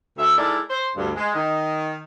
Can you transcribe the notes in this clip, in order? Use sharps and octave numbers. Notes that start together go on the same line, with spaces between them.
D2 E5
G#3 D#4 E4 A4 A#4 D5
C5
D2 G2
G#3
D#3 D#5